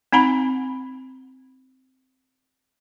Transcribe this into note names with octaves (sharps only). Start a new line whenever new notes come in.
C4 D#4 F#5 A#5 B5